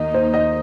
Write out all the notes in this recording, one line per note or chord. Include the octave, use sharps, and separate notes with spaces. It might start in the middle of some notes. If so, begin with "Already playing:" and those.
Already playing: D#2 D#3 A#3 D#4 D#5
C5
D#5